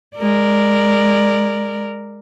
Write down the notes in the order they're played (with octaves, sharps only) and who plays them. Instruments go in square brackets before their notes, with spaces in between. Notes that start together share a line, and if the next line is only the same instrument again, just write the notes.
[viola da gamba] G#3 A#4 D5